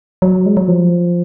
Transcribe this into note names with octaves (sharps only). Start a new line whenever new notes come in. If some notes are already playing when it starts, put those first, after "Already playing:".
F#3
G#3
F#3
F3